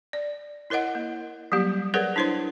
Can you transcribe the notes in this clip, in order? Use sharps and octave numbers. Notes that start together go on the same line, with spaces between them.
D5
E4 A#4 C#5 D#5 F#5
A#3
F#3 G3 A#3 G4
G#4 A#4 B4 C#5 D5 F#5
D4 E4 C5 C#5 C6